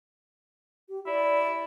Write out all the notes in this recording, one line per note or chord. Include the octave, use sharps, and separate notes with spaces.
G4
E4 D5